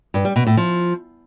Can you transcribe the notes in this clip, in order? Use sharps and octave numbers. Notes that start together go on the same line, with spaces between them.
G2
G3
B2
A2
F3